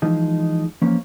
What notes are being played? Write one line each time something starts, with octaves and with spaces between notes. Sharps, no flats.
E3 F3 G#3 D#4
E2 F3 A#3 C#4